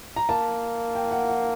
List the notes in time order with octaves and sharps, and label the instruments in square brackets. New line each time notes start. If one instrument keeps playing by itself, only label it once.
[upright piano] A#5
[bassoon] A#3 [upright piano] A5
[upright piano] G5
F#5
F#5